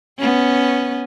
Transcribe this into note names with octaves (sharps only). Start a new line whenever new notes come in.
B3 C#4